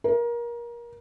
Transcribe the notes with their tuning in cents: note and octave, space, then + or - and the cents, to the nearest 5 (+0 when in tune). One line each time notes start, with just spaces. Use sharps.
A#4 +25